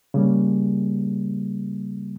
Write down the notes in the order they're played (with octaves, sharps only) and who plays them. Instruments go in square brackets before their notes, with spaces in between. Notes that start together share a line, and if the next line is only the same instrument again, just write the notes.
[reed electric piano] C#3 G3 A#3